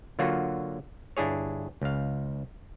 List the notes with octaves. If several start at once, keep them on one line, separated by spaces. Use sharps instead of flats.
D3 F#3 A#3 F4 F#4
G1 D4 E4 G#4 C#5
C#2 F5